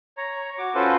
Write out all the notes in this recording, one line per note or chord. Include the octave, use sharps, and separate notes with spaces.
C#5 A#5
F#4 D6
C#4 F4 F#4 A4 B4 C5